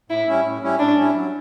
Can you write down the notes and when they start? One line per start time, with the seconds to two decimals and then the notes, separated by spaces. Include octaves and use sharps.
0.10 A2 E4
0.27 G3 C#4 E4
0.44 A2
0.62 G3 C#4 E4
0.79 A2 D4
0.97 G3 C#4 E4
1.14 F#3